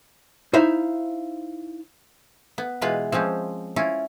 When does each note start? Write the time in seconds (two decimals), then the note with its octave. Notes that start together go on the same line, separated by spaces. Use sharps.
0.53 D#4 E4 C5 E5 F5
2.58 B3
2.81 B2 E3 G#3 F4 B4
3.12 F3 G#3 C4 C#4
3.76 C#4 E4 F4